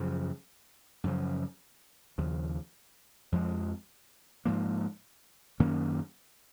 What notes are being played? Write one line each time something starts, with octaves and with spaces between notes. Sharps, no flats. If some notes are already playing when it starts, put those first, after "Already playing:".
Already playing: F#2 C#3 F3
F#2 C#3 F3
D#2 C#3 F3
F2 F3 G#3
G#2 F3 A#3
F#2 D#3 A#3 C#4